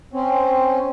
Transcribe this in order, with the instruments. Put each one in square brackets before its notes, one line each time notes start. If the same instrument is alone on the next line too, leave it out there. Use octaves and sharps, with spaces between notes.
[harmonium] C4 C#4